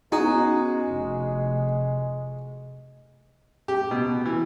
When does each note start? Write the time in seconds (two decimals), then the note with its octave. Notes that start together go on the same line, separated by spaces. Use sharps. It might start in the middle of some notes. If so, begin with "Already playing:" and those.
0.12 G#3 B3 C#4 D#4 F#4 G#4 G#5
0.88 F1
3.68 G4
3.91 B2
4.26 E3